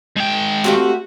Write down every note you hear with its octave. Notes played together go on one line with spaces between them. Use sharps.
G#2 G5
A3 C4 F#4 G4 F5